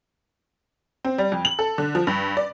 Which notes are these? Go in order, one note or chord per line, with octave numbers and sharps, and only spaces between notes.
C4
G3
F2
F#7
A4
D3
F3
G2
D5